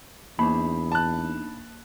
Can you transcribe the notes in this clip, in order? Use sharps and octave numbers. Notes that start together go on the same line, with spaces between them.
E2 A#3 D4 D#4 B5
A5 F#6